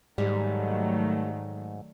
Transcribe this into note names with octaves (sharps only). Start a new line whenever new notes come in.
G#2 D#3 F#3 G3 A3